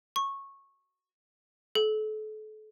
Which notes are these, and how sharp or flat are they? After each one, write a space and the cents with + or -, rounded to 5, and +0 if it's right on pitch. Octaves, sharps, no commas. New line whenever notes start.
C#6 -15
A4 -35